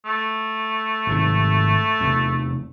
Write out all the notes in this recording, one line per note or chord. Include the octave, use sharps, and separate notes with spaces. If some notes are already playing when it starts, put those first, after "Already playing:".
A3
G#1 G#2 C3
F1 E2